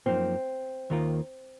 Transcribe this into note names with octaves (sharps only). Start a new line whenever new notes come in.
F#2 F3 A#3 C4 D#4
D#2 D#3 A#3 F4 A#4